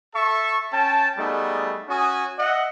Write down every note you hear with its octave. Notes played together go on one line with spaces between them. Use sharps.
A4 E5 A5 C#6
C#4 G5 A5
G3 A3 B3 D#4 G#4
C#4 F#4 G#5 D#6
D#5 E5 F#5